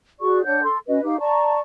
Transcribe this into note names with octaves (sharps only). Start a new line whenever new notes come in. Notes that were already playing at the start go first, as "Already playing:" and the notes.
F#4 G#4 D5 C#6
D4 C#5 F#5 G6
A4 C6
C#4 F#4 B4 D#5
D#4 G4 F5
D5 A5 A#5 C#6